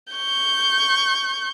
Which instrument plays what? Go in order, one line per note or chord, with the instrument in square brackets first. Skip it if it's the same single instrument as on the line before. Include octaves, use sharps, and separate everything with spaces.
[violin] C#6 G6